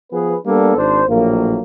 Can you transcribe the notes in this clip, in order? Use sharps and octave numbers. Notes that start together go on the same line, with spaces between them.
F3 B3 G#4 B4
G3 A#3 B3 D4 A4
G#1 D4 C5
A#1 A2 F#3 A#3